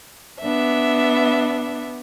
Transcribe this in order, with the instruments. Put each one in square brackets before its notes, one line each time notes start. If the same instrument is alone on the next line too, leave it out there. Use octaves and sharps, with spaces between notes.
[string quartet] B3 D4 E5